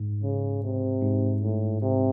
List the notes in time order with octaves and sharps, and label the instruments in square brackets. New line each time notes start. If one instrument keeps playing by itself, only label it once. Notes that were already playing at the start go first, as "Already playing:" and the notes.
Already playing: [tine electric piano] G#2
[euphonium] C#3
C3
[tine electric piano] G#2
[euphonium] A2
[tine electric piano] G#2 [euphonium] C3